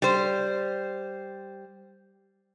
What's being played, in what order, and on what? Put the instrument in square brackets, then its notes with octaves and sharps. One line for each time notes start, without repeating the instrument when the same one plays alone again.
[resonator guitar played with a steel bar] G3 C5